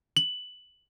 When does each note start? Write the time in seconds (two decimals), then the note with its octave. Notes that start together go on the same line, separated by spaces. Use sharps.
0.17 F#7